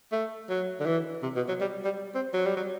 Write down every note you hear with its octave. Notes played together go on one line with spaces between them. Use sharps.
A3
F#3
D3
E3
C3
B2
F#3
G3
G3
C4
F#3
G3
F#3